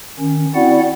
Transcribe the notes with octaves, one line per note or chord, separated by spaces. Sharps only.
D#3 C#4
C4 E4 F#4 D5 F#5